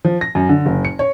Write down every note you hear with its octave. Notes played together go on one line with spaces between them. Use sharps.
F3
A#6
F#2
D3
F#1
C#7
C#5